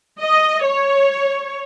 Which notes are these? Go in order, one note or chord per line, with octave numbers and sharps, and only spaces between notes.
D#5
C#5